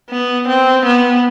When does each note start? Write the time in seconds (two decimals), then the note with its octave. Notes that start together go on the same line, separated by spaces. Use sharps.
0.10 B3
0.48 C4
0.85 B3